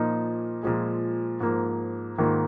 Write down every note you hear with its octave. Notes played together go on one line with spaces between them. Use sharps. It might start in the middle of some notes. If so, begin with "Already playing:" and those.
Already playing: A#2 F3 A#3 D#4
A#2 F3 G#3
G#2 F3 A#3
G#2 D#3 A#3 F4